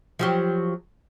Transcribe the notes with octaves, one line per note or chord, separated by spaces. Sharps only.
F3 F#3 G4